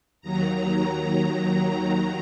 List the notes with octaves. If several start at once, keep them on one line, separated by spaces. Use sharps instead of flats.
D#2 D#3 F#3 A#5